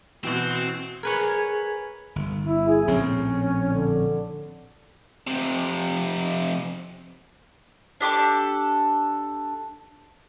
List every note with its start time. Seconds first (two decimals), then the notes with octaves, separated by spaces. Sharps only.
0.24 B2 E3 C4 F#4 C5
1.03 G#4 A#4 B4 C#5 G#5
2.16 G1
2.47 E4
2.68 G#4
2.87 A#1 A2 C4 C#4
3.72 D3
5.27 F2 C3
8.00 D4 G4 A4 D6